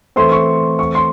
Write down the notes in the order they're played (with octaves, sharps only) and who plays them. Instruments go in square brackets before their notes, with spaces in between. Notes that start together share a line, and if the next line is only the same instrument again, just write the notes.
[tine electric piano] E3 A3 C4 [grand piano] C6
[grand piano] C#6
C#6
C6